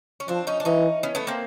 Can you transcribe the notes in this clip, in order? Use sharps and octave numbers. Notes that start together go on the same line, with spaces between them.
C#4
F3 C4 D4
C#4 D#4
D4
E3 C#4 D#4
B3 C#4
A3 B3
A#3 C4